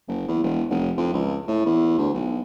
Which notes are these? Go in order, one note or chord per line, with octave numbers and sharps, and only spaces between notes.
F#1
E2
E1
F1
F2
C#2
A2
E2
D2
B1